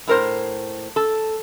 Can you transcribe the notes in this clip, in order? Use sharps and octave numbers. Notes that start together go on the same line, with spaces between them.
A2 A#4 C5
A4